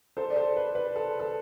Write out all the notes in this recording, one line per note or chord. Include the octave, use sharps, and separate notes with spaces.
A4 C5
D5
A4 C5
B4
B4
A4
A4